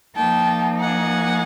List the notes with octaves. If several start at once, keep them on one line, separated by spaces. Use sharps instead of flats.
F3 A#3 D#4 G5 A5
F#5 G#5